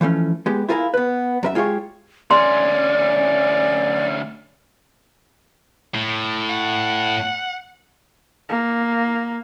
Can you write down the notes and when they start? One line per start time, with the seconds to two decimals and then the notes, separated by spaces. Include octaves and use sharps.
0.01 E3 F3 A3 C#4
0.46 G#3 B3 G4
0.69 E4 F4 G#4 A#4 D#5 F5
0.94 B3 B4
1.43 F#2 A#4 E5
1.55 G#3 F4 G4 G#4 C#5
2.31 D2 C#4 D5 C6
5.94 A2
6.49 F#5
8.49 A#3